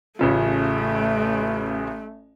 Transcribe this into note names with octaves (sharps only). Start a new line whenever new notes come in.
A1 C#3 A3 F4